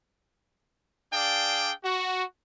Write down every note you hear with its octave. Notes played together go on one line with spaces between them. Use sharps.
D4 G#4 D5 F5 G5
F#4